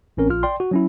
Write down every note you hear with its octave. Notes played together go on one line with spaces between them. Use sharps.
A1 C4 C#4 A#4
A#1 F4 F6
D5 G5 C6
F#4
F#3 C#4 E4